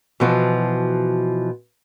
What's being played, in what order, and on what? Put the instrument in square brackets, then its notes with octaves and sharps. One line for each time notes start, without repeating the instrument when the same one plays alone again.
[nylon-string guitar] B2 E3 F3 B3 F#4